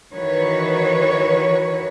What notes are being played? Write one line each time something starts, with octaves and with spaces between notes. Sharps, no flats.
D#3 E3 F#4 B4 C#5